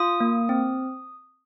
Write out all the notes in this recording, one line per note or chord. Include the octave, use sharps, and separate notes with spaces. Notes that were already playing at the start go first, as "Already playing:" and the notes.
Already playing: F4 D#6
A#3
C4